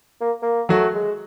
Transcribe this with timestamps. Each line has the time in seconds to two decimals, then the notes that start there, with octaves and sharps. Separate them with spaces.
0.21 A#3
0.42 A#3
0.69 F#3 A3 F#4
0.94 G#3